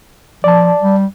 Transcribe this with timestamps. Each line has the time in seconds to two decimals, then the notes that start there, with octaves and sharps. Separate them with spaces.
0.44 F3 D5 A5
0.82 G3